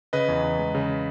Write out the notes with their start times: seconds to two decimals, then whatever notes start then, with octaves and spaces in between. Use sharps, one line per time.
0.13 C#3 B4 D#5
0.28 E2
0.43 E2
0.59 G#3
0.75 C#3